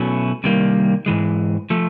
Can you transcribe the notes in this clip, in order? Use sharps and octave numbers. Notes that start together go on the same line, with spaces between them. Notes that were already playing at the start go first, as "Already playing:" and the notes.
Already playing: B2 F#3 A3 C#4 E4
C2 C3 D#3 G3 A#3
G#2 E3 G#3
F3 A3